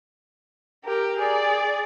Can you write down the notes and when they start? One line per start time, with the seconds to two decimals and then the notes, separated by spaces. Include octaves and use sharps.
0.84 G4 A#4
1.18 G#4 D5